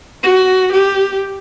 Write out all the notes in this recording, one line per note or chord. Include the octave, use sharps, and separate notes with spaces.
F#4
G4